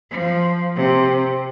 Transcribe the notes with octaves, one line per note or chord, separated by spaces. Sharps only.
F3
C3